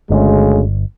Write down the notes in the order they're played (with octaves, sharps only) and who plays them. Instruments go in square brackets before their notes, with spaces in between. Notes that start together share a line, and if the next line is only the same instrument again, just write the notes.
[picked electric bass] G1 [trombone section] D2 C#3 G#3